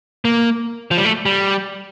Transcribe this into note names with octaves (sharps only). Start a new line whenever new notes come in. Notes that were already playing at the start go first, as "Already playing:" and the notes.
A#3
F3
G3
A3
G3